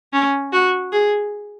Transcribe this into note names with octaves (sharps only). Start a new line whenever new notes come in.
C#4
F#4
G#4